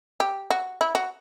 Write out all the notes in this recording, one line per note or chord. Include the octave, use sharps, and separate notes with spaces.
G4
F#4
E4
F#4